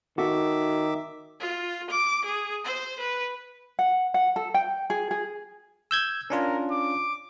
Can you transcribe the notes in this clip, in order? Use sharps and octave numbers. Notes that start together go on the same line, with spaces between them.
D#3 F#4 A4 E5 D6
F4
D6
G#4
C5
B4
F#5
F#5
A4
G5
G#4
G#4
E6 G6 G#6
C#4 D4 F4 A#4
D6